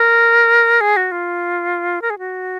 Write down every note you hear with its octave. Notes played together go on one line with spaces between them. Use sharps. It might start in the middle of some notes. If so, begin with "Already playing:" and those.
Already playing: A#4
G#4
F#4
F4
A#4
G#4
F#4